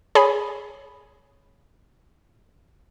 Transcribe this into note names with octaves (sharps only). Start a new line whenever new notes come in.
G#4 C#5 G#5 B5